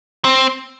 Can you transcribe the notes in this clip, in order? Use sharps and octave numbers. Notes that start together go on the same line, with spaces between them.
C4